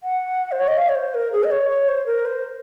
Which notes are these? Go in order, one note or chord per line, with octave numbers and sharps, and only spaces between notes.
F#5
C5
C#5
D#5
F5
C#5
C5
A#4
G#4
D#5
C#5
C#5
C5
A#4
C5